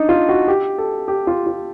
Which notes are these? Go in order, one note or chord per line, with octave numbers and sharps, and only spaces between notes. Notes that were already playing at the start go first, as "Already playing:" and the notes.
Already playing: D4 D#4
F4
F#4
G4
A4
G4
F4
F4